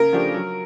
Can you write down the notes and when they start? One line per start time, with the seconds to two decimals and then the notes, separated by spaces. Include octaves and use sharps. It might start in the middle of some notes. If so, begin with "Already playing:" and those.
Already playing: C#3 A#4
0.13 F3 A3 D4 G4
0.34 F#3